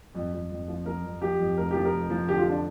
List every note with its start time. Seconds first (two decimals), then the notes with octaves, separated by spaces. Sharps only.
0.15 F2
0.33 F2
0.50 F2
0.68 F3
0.85 F3 A#4
1.04 F2
1.22 F3 G4
1.39 F2
1.57 F1 A#4
1.71 F3 G4
1.85 A#4
1.92 F1
2.10 F3
2.28 D3 G4
2.38 F4
2.49 D4